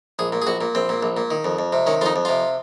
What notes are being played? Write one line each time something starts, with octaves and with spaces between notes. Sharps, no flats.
A#1 G#4
A#2
G#4
A#1 F#4
A#2
A#1 C4
A#2
A#1
A#2
D#3
F2
F2
C3
D#3 C#4
F2 D#4 F4
F2
C3 F4